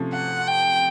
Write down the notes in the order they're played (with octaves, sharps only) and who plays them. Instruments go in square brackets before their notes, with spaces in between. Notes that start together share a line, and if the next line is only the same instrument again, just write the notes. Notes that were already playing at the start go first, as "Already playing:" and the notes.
Already playing: [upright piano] C3 F3 A3 C#4
[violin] F#5
G5